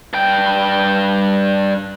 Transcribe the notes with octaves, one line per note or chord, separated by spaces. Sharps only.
G2 G5